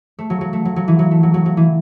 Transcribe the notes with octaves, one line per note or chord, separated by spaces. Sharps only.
A3
F#3
F#3
A3
F#3
F#3
E3
F#3
A3
F#3
F#3
F#3
E3